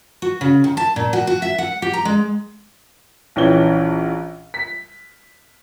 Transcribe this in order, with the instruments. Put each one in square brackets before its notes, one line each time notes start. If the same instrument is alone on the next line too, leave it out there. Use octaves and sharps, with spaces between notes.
[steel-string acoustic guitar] F#4
C#3
D#3
A5
A#2
F#4
F#4
E5
F#5
G4
A#5
G#3
[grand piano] A#1 E3 C#4 G5 G7
B6